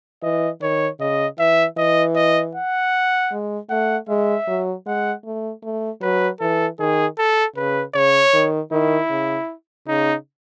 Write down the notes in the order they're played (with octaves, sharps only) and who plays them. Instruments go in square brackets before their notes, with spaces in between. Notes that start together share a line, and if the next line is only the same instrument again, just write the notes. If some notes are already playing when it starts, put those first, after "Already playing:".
[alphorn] E3 [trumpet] D#5
[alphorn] D#3 [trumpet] C#5
[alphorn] C#3 [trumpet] D#5
[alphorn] E3 [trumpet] E5
[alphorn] E3 [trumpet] D#5
[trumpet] D#5
F#5
[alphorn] G#3
[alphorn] A3 [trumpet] F#5
[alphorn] G#3 [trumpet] E5
[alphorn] F#3
[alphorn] G#3 [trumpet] F#5
[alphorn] A3
A3
[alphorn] F#3 [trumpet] B4
[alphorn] E3 [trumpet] A4
[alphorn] D#3 [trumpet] G#4
[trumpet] A4
[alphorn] C#3 [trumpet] B4
[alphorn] C#3 [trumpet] C#5
[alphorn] D#3
[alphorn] D#3 [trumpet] E4
[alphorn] C#3
[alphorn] C#3 [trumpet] D#4